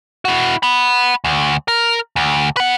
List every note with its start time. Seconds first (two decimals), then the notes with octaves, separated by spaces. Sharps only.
0.25 E4 F#4
0.63 F#5 B5
1.24 D2
1.68 A#4
2.16 D2
2.57 B4 F#5